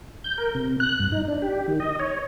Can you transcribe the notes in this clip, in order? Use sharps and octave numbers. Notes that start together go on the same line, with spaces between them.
G6
A#4
C3
F#6
G2
D#4
D4
G4
D#3
D#5
C#5